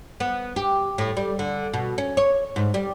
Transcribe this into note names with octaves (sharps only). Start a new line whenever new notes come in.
B3
G4
A2
G3
D3
B2
C#4
C#5
G#2
G3